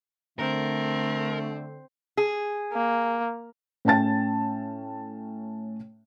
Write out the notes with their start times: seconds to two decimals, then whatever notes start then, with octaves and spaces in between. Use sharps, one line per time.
0.39 D3 A3 C4 A#4
2.17 G#4
2.73 A#3
3.85 A2 C#4 G5 A5 A6